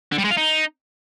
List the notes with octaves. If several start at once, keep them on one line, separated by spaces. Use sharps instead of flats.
D3
G3
G#3
F4
D#4